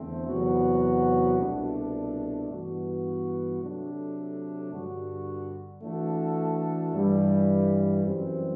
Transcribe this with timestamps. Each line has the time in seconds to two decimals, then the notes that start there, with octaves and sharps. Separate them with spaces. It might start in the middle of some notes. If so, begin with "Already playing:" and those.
Already playing: E2 D3 A3 C4
0.27 E2 C3 F#3 B3 F#4
1.38 C2 B2 A3 D4
2.49 G2 E3 B3 F#4
3.60 C3 F#3 A3 D4 A4
4.71 G2 D3 G3 D4 F#4
5.82 E3 A3 D4 F#4 A4
6.93 G2 E3 G3
8.04 F#2 E3 G3 C4